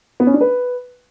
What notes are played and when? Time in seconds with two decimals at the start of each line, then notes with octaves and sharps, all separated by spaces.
0.20 B3
0.27 C#4
0.34 D4
0.41 B4